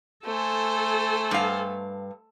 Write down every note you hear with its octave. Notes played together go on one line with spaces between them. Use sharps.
A3 A4 C5 G#5
G2 F5